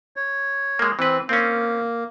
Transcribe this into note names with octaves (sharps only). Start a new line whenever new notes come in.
C#5
G#3 A#3
E3 C4 B4
A#3 C4 C#4